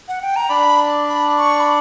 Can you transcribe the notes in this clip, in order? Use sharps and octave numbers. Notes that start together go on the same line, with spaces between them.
F#5
G5
A#5
D4 D5 B5
B5
C#6
B5